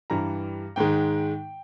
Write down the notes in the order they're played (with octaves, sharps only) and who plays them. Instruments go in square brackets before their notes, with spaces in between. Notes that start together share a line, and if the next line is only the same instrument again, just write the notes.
[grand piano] G2 E3 G3 A#5
G#2 D#3 G#3 G5